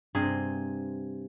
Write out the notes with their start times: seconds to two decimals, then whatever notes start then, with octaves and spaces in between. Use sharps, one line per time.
0.15 G2 C3 G#4 C5